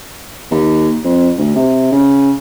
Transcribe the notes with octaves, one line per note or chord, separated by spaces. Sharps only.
D#2
F2
D2
C3
C#3